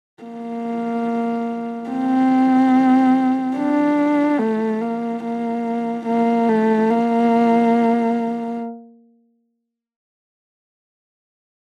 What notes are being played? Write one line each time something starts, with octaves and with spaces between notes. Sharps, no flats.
A#3
C4
D4
A3
A#3
A#3
A#3
A3
A#3